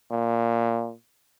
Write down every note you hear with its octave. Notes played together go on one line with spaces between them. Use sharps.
A#2